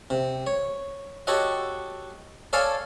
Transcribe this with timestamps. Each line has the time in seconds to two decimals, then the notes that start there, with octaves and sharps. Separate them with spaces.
0.10 C3
0.47 C#5
1.27 F#4 G4 A4 C#5 D#5 F#5
2.53 A4 C#5 D5 F5 G#5 A5